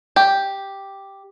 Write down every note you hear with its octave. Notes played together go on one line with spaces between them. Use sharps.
G4